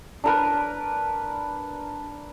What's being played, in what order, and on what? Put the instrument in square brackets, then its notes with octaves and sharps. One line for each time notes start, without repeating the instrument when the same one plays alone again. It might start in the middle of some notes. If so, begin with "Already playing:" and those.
[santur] D4 A#4 B4